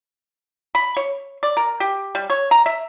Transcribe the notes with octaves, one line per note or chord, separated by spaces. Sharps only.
B5
C#5
D5
A#4
G4
G3
C#5
A#5
E5